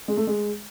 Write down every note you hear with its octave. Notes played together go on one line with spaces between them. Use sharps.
G#3
A3
G#3